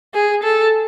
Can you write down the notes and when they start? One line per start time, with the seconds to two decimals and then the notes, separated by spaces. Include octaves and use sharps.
0.14 G#4
0.43 A4